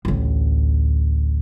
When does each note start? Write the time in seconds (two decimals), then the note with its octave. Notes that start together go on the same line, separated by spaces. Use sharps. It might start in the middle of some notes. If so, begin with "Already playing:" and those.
0.05 A1 D2